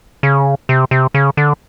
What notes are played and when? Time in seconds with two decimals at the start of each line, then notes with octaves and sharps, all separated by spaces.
0.23 C#3
0.69 C3
0.91 C3
1.14 C#3
1.37 D3